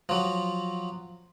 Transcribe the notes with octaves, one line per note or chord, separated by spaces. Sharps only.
F3 F#3